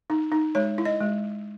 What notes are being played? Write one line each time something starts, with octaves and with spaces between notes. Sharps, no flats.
D#4
D#4
G#3 C#5
E4
D#5
G#3